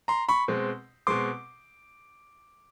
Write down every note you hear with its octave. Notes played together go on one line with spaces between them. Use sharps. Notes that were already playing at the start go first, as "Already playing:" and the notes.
A#5 C6
B5 C#6
B2 G#3 C4
B2 G#3 C4 C6 D6